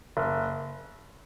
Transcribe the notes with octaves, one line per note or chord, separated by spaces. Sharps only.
F#1